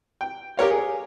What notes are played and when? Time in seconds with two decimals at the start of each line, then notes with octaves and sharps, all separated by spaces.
0.21 G5
0.57 G4 A#4 C#5 F5
0.70 G#4